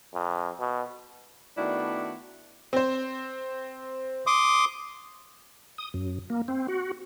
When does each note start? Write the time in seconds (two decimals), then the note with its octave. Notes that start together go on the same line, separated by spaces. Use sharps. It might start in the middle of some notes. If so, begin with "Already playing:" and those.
0.14 F2
0.60 B2
1.57 D#3 A3 B3 D4 E4 F#4
2.73 C4 C5
4.27 C6 D6 D#6
5.78 D#6
5.94 F#2
6.30 A#3
6.48 C4
6.68 F#4